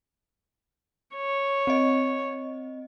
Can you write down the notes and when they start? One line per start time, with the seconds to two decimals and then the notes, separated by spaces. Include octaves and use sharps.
1.16 C#5
1.67 C4 D#5